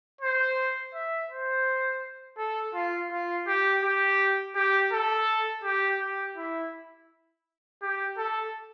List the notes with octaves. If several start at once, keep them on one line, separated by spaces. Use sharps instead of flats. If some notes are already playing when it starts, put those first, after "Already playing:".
C5
E5
C5
A4
F4
F4
G4
G4
G4
A4
G4
G4
E4
G4
A4